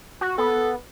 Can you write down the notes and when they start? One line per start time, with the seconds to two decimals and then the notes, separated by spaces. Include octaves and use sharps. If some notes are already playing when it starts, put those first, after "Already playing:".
0.21 F#4
0.38 B3 A4